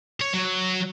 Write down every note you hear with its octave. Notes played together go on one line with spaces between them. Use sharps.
C#5
F#3